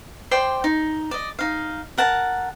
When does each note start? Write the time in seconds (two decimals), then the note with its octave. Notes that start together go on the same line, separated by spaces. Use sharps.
0.31 C5 D5 G5 C6
0.64 D#4
1.11 D5 D#5
1.39 D#4 F5
1.98 A#4 F#5 A5